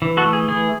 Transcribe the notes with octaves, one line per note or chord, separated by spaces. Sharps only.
E3
F#4 A4
A3
G#4
E3 G#4